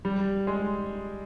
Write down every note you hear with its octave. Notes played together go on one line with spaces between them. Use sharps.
G3
G#3